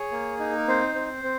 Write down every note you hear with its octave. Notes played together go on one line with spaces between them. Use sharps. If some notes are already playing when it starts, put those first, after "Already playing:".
Already playing: G#4 C#5
A#3
D#4
A#4
C4 C5
C4
C4